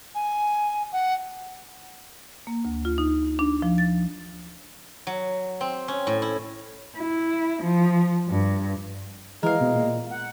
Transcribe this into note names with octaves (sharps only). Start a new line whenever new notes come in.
G#5
F#5
A#3
D2
F4
D#4
D4
F3
A6
F#3
C4
C#4
A2
E4
E4
F3
G2
E3 G#3 A#4 F5
B2
A#2
F#5